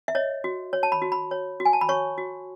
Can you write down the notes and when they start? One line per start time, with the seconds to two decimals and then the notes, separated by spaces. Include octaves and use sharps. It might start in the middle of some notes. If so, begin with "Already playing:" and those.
0.08 E5
0.15 C#5 D#5
0.44 F#4
0.73 C#5
0.83 A5
0.92 B5
1.02 F#4
1.12 B5
1.31 C#5
1.60 F#4
1.65 G#5
1.73 A5
1.81 B5
1.89 C#5 C#6
2.18 F#4